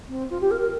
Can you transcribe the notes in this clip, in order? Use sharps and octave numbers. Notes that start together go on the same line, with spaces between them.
C4
F4
G4
A#4
A#4